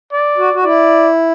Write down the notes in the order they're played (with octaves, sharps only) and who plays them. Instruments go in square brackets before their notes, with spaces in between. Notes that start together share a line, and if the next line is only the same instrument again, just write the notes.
[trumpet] D5
[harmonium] F#4
F#4
[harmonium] E4 [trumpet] D5